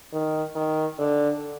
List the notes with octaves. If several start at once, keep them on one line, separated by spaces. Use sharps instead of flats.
D#3
D#3
D3